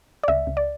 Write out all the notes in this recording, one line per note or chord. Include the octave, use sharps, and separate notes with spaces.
D5
C#2 E5
C#2
D5